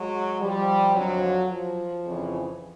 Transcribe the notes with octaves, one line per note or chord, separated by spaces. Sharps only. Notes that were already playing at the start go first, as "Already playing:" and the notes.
Already playing: F#3 G#3
F3 G3
F2 D3 F3 F#3
F3
F2 C#3 E3